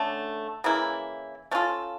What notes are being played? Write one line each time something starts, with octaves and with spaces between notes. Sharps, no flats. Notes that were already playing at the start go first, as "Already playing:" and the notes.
Already playing: D3 A3 C#4
C#3 E3 A#3 E4
A3 C#4 F4 A4